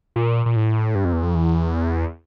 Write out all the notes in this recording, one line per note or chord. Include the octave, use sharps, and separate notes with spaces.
A#2
A#2
A2
G2
F2
E2
F2
E2